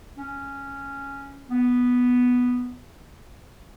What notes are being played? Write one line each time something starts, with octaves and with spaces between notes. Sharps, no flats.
C#4
B3